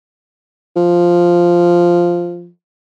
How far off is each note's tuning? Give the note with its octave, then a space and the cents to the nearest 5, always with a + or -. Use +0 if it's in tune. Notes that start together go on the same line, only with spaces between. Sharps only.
F3 -5